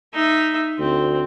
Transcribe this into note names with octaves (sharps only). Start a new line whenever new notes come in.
D#4 E5
D2 C4